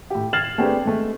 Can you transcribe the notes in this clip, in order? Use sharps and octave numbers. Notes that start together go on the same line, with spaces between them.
A2 G4
F6 G#6 A6 C7 E7 F#7
A3 C4 D4 G4 G#4 B4
G#3 A3